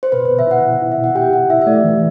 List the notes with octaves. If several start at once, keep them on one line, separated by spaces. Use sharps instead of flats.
C5
B2 B4
B2 B4
E5
E4 F#5
B2
E4
E5
B2
F#5
G4 G5
E4 F#5
E4 E5
E5
A3 D5
E3